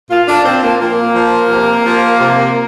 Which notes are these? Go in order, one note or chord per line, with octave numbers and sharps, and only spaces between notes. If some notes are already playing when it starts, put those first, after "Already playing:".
A#2 F4
D4
F3 C4
A#3
A#2 A#3
F3
C3
F3
C3